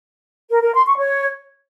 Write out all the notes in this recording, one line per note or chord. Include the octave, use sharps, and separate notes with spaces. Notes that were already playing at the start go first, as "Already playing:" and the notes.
A#4
A#4
C6
C#6
C#5